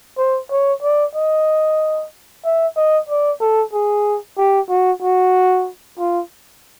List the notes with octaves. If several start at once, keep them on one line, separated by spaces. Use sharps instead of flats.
C5
C#5
D5
D#5
E5
D#5
D5
A4
G#4
G4
F#4
F#4
F4